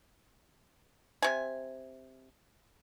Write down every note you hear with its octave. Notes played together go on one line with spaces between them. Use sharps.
C3 G#5